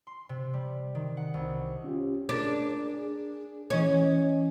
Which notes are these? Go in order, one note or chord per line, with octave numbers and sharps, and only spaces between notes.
C6
C3
G3
D#3
F#5
C2
C#4 F4 G4
D4 G#4 A#4
G#4
E3 C#4 D#5 G#5